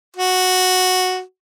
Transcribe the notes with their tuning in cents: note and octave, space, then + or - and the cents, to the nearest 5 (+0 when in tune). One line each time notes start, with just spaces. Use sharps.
F#4 -5